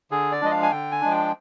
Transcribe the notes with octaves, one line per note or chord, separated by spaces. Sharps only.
D3 G#4
D5
F3 G#3 D4 D#5
F5
G#5
D3 G5
G#5
F3 G#3 D4
G5